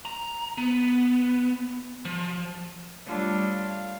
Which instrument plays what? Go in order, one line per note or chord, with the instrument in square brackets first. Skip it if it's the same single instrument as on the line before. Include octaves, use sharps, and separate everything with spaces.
[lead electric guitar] A#5
B3
F3
[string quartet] G3 A3 D4 F4 A4 C#5
F5